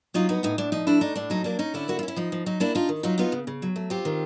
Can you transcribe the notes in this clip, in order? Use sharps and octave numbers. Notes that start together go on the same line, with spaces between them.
F#3 D#4 F4
B3 D#4
A2 D#4
A2 D4
F3 D#4
A3 D4 E4
D4 D#4
A2 D4
F#3 D#4
A#3 D4
C#4 D#4
D3 D4 E4
A#3 F#4
F4
C#4
E4
F3 D#4
F3
F#3 D#4
A#3 D4 E4
D4 D#4 F4
D#3
F#3 D#4 F4
B3 D#4 F4
C#3
C#3
F#3
A3
C4 F4 G4
D#3